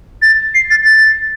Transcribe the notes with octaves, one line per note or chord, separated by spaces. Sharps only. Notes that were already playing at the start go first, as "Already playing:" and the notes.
A6
C7
A6
A6